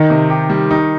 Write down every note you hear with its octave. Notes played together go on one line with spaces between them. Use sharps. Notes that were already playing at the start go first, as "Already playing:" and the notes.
Already playing: D#3 D#4
C3
G4
G3
D#4